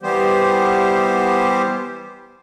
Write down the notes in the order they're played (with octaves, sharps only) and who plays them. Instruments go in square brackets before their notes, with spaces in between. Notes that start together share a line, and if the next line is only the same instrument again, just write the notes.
[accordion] E3 G3 B3 G4 C5